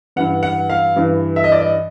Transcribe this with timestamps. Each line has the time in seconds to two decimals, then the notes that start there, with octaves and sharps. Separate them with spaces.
0.16 G2 E3 F#5
0.43 F#5
0.70 F5
0.96 G2 E3
1.36 E5
1.44 D#5
1.52 D5
1.60 D#5